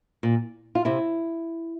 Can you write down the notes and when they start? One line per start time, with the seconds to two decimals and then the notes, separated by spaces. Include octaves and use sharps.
0.23 A#2
0.75 F4
0.85 C3 E4